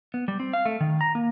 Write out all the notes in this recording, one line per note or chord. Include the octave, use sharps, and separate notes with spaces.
B3
G3
C4
F5
A3
D#3
A#5
A#3